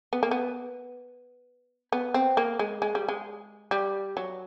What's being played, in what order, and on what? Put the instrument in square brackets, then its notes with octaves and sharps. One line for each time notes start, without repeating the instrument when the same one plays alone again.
[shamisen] B3
A#3
B3
B3
C4
A#3
G#3
G#3
G3
G#3
G3
F#3